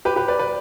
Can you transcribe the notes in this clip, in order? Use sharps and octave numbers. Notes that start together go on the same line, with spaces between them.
G4 B4
G4 B4
B4 D5
B4 D5